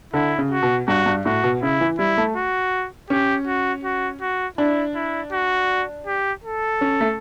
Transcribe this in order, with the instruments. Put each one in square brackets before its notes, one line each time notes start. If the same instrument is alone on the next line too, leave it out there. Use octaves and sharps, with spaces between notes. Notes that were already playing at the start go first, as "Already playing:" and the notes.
[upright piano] D3 [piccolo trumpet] E4
[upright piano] C#3
[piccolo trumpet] F#4
[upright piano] B2
[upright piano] G2 [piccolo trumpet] F#4
[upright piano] G2
[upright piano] A2 [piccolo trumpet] F#4
[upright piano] B2
[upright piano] C#3 [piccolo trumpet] E4
[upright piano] E3
[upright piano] G3 [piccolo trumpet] E4
[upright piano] A3
[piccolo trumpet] F#4
[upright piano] C#4 [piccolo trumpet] G4
[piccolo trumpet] F#4
F#4
F#4
[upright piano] D4 [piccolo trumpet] E4
[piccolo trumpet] E4
F#4
G4
A4
[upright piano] C#4
A3